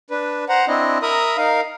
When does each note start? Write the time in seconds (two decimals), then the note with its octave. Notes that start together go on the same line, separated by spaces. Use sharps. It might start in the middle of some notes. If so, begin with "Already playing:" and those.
0.11 D4 B4
0.49 C5 F#5 A#5
0.68 C4 D4 E4 D#5
1.02 A#4 E5 A#5 B5 D#6
1.37 D#4 A#4 F5